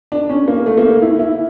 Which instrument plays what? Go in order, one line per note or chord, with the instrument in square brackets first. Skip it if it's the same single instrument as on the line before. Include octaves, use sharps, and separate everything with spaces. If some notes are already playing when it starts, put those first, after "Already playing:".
[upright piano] D4
C#4
A#3
A3
A#3
A3
E4
E4